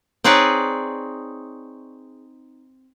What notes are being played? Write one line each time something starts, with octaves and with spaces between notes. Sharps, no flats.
C4 D#4 G#4 B4 C#5 D5